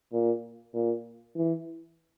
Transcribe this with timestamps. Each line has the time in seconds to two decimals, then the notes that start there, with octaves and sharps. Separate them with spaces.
0.13 A#2
0.74 A#2
1.36 E3